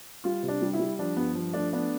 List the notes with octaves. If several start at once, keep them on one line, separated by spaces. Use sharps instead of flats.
G3 F4
C3
D4
G3
E4
G3
F3 D4
G2 B3
F3
A3 D4
B3 D4